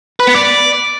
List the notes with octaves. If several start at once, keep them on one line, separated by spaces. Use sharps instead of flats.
B4
B3
D5